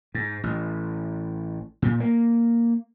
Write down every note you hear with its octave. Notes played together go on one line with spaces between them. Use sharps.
G#2
A1
A#2
A#3